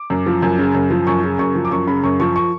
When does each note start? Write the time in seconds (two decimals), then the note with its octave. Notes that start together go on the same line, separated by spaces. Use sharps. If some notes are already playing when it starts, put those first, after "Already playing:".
Already playing: D6
0.10 F#2
0.26 F3
0.42 F#2
0.58 C#3
0.75 F#2
0.90 F3
1.07 F#2 C#6
1.23 C#3
1.39 F#2 C#6
1.55 F3
1.65 D6
1.71 F#2 C#6
1.87 C#3 B5
2.04 F#2 C#6
2.20 F3 C#6
2.36 C#6